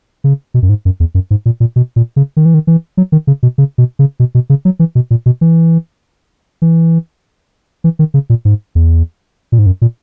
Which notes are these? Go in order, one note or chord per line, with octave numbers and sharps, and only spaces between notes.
C#3
B2
F#2
G#2
F#2
E2
F#2
G#2
A#2
A#2
B2
A#2
C#3
D#3
E3
D#3
E3
F#3
D#3
C#3
B2
C#3
B2
C#3
B2
B2
C#3
F#3
E3
B2
A#2
B2
E3
E3
E3
D#3
C#3
A#2
G#2
E2
A#2
G#2
F#2
A#2